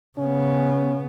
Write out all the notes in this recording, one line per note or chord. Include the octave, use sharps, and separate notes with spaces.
C#3 B3 C#4